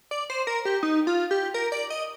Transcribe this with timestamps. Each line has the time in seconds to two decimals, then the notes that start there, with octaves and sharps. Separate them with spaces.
0.11 D5
0.30 C5
0.47 A#4
0.65 G4
0.83 D#4
1.07 F4
1.31 G4
1.54 A#4
1.72 D5
1.90 D#5